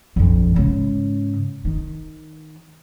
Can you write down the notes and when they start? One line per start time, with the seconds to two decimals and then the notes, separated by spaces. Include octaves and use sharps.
0.16 A#1 F2
0.55 G#2 C#3
1.65 D#3